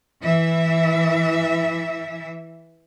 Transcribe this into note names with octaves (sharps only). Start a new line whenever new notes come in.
E3 E5